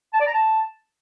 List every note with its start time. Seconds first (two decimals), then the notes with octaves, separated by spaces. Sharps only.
0.14 A5
0.20 D5
0.27 A#5
0.34 A5